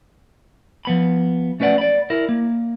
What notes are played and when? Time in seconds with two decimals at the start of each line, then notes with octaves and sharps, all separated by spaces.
0.85 F3 B3 B5
1.60 A3 C#4 B4 D5 F#5
1.78 D5 B5
2.10 E4 A#4
2.29 A#3